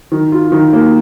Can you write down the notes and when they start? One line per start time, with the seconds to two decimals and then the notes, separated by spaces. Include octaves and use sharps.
0.12 D#3
0.32 F4
0.52 D#3
0.73 A#3